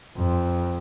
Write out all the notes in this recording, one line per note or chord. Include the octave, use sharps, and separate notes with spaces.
F2